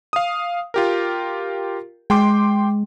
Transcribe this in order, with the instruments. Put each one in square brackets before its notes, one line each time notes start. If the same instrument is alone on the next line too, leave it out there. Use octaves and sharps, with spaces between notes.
[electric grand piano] F5 D#6
F4 G4 A#4
[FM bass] G#3 [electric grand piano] G5 C6 D6